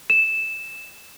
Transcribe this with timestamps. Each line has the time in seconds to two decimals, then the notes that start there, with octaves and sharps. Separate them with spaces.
0.10 E7